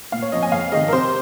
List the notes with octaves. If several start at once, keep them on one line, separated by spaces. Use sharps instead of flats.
A#2 F5
C#5
F3 C4 D#5
G#5
F2 F5
C3 D#3 G#3 D#5
A#4
C3 C5